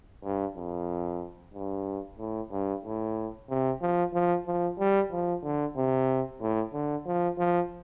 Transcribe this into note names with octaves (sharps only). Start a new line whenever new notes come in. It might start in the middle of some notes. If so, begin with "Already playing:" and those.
G2
F2
G2
A2
G2
A2
C3
F3
F3
F3
G3
F3
D3
C3
A2
D3
F3
F3